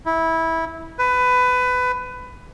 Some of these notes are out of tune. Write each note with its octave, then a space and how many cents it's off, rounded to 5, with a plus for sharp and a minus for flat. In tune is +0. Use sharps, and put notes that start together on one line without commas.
E4 -15
B4 +20